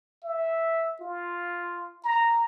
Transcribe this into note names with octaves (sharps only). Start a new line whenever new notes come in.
E5
F4
A#5